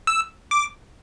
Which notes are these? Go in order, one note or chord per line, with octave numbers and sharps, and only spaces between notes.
E6
D6